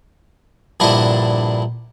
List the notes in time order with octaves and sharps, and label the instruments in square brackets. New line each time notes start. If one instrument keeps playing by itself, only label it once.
[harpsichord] A#1 G2 D3 D4 E4 D#5